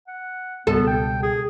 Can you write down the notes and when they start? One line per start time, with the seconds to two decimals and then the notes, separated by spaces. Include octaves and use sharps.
0.08 F#5
0.67 C#2 B2 G3 B3 A4
0.87 G5
1.23 G#4